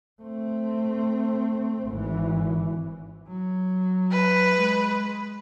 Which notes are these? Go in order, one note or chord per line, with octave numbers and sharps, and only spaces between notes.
A3 C4
G#1 E3
F#3
B4
G#3